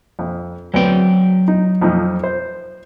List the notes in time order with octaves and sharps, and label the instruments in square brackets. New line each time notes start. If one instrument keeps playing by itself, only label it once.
[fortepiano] F2
[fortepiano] D2 B3 C4 [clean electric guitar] F#3 G5
[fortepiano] D#4
F2 F3 D#4
C5